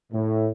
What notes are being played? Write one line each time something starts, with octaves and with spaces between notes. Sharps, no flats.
A2